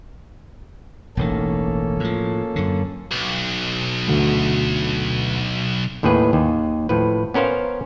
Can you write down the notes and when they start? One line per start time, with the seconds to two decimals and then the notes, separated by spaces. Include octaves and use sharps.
1.17 E1 A1 D#3 A#3 C#4 A4
2.00 A2 F3
2.56 F#2 D3
3.11 B1
4.07 D2 A3
6.03 D#2 A2 D#3 G#4 B4
6.33 D#2
6.89 A2 F3 B4
7.34 B3 C#4 A#4 C5 F5